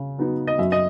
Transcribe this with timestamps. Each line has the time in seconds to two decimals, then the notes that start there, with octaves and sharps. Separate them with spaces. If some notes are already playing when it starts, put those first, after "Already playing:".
Already playing: C#3
0.18 F#3 B3 D#4
0.47 D#5
0.58 F#2 E5
0.72 D#5